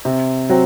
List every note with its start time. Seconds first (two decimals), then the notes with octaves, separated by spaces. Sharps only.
0.05 C3
0.49 F#3 C4